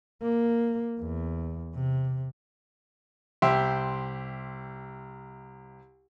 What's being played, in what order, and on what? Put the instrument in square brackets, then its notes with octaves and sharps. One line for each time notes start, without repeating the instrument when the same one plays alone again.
[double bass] A#3
E2
C3
[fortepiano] C2 G4 E5 G5 C6